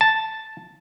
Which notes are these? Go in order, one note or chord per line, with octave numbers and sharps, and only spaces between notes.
A5